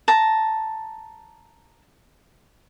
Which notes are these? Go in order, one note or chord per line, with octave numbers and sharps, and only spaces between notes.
A5 A#5